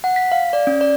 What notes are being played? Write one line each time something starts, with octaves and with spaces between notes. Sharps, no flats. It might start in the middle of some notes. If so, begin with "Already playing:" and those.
F#5
B6
F5
D5
C#4
D5